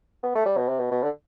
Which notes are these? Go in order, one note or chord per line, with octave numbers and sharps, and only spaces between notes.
B3
A3
G3
B2
C3
B2
B2
D3